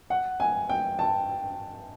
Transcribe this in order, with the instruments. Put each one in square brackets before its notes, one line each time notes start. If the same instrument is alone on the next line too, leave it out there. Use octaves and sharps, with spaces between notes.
[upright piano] F#5
G#5
G5
A5